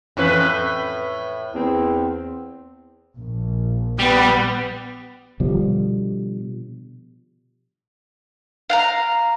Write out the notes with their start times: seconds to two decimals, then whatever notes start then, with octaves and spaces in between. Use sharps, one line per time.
0.17 F2 A2 E3 C#4 B4
1.54 E2 C4
3.16 A#1
3.99 G3 B3
5.40 B2 D3 F3 G3
8.70 F5 F#5 A#5